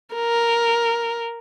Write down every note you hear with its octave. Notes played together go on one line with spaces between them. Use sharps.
A#4